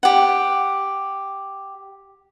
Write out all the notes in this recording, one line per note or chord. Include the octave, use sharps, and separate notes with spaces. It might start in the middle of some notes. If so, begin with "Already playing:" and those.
G4 F#5